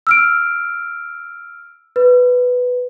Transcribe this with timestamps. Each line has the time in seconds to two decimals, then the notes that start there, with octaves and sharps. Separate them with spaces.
0.07 E6 F6 D7
1.96 B4